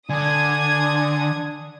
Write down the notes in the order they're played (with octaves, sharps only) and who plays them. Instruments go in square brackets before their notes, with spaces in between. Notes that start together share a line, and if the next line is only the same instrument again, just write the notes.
[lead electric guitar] D3 [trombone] D4 [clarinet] G#5 [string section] D#6 G#6